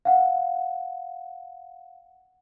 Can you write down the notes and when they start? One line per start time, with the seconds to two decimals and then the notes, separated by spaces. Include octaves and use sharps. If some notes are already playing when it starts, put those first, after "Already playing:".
0.05 F5 F#5